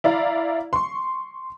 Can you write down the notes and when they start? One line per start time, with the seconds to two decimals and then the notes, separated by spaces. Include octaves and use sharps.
0.04 E4 D5 F5 A#5
0.73 C6 C#6